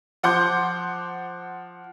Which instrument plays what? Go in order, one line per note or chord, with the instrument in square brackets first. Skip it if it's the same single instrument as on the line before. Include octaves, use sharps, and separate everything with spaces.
[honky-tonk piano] F3 F#5 C6 D6 G6